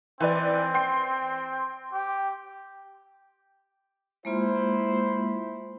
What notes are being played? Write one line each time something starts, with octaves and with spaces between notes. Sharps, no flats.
E3 C4 B4 D5
G5 C6 C7
G4
G#3 A#3 E4 F4 C5